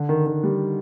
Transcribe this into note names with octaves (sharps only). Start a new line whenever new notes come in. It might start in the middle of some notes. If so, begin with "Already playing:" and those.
Already playing: D3
D#3
D#3
G3